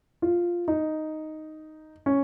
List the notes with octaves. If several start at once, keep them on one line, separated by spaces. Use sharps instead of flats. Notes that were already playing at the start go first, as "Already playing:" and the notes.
F4
D#4
C#4